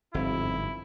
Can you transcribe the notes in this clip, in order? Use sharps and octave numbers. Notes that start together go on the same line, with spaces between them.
G1 F2 G#2 E4